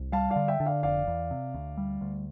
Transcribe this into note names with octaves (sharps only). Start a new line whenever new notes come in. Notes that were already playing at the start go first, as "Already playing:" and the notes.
Already playing: C2
G3 F5 A5
D5 F5
D3
E5 G5
D3
D5 F5
F1 D5 F5
E2
C3
D2
G3
D2